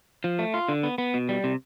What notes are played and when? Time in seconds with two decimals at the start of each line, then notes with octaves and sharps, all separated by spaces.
0.24 F3
0.39 A3
0.54 F4
0.69 D3
0.83 B3
0.98 B3
1.14 B2
1.29 G3
1.44 C3